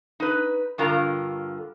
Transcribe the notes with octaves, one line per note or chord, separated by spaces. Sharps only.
D#4 B4
G2 D3 F4 A#4 A#5